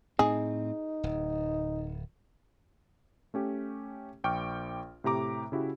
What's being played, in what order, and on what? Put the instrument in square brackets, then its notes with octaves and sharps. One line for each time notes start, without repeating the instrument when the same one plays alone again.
[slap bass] A2 C4 [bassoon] D#4 [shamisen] G#4
[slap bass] D1
[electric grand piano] A3 C#4 G4
A#1 G5 C#6 D6 F6
A2 C3 G4 A#5 D6
C#3 E4 F#4 G4